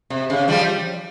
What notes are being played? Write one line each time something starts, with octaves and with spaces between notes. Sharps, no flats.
C3
C#3
F3 G3